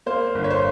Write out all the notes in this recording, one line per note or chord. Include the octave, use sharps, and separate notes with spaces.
A#3 C5
G1
C#5
C5